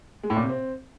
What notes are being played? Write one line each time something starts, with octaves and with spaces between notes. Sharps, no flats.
G#3
A2
A#2
C3
C4